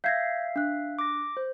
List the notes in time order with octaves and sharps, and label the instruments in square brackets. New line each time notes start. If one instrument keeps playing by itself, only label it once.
[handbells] E5 F5 [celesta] G6 G#6 A#6
[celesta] D4 F#6
[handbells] D6 A#6
C5